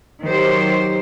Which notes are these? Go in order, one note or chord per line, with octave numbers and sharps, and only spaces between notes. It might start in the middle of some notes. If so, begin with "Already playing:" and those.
D#3 F#3 G4 C5